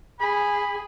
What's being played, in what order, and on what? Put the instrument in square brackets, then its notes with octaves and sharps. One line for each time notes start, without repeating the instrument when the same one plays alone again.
[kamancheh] G#4 [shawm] B5